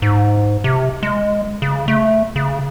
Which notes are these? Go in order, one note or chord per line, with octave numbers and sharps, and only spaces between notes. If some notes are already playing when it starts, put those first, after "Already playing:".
G#2
C3
G#3
C#3
A3
C#3